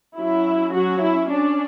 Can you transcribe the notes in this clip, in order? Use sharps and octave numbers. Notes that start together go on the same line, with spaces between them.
F#3 C#4 E4
F#3 F#4
E4
D4